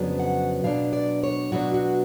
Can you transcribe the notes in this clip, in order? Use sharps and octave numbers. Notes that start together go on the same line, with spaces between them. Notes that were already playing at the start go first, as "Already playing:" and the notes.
Already playing: F2 C#3 F#3 B3 D4
F#5
B2 F#3 B3 D4 F5
D5
C#5
B2 F#3 B3 D4 F#4
F#4